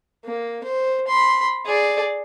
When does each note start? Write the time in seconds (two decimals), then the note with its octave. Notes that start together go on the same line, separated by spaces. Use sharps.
0.25 A#3
0.64 C5
1.08 B5 C6
1.66 G#4 D5